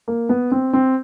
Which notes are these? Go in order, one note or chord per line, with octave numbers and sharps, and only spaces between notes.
A#3
B3
C4
C4